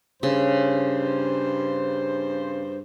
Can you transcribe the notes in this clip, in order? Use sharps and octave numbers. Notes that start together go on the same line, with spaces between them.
G2 C#3 C5